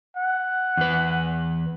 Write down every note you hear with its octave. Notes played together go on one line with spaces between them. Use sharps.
F#5
E2 B4